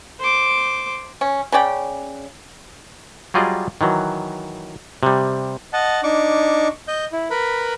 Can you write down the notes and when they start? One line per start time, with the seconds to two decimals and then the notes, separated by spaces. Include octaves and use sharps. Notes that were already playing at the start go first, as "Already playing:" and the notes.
0.19 C5 D6
1.21 C#4
1.52 C#3 C#4 D5 G5
3.34 F#3 G3 F4 G#4 D5 D#5
3.81 D#3 E3 F#3
5.03 C3 G3
5.73 D#5 F#5 A5
6.03 D4 D#4 C#6 D6
6.88 D#5 G6
7.13 E4
7.30 A#4 B4 B5